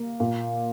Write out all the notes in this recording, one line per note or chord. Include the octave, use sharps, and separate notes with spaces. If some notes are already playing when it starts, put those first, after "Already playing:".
Already playing: A#3
A#2